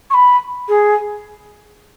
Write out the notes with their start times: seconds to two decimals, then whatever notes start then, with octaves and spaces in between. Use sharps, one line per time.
0.10 C#6
0.14 B5
0.68 G#4